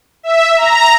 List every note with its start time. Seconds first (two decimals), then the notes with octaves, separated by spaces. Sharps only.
0.23 E5
0.56 A#5